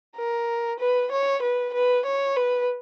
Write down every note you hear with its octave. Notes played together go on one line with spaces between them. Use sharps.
A#4
B4
C#5
B4
B4
C#5
B4